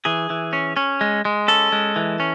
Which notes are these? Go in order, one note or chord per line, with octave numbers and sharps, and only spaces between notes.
E3 G#4
E3
C#4
C#4
G#3
G#3
C#4 A4
G#3
E3
C#4